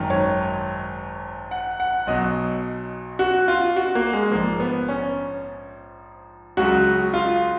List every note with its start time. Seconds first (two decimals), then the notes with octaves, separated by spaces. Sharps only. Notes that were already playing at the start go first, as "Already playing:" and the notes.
Already playing: G#1 F#2 D#3
0.10 C#5
1.51 F#5
1.80 F#5
2.07 B1 B2 F#3 D#5
3.19 F#4
3.48 F4
3.76 F#4
3.95 A#3
4.13 G#3
4.32 A#1 G#2 F3 A#3
4.60 B3
4.88 C#4
6.57 C#2 C#3 F#3 F#4
7.14 F4